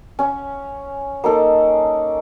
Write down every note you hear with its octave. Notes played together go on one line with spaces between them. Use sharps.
C#4
A#3 D#4 A4